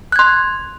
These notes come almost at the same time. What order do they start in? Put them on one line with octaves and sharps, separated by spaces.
F#6 G#6 C6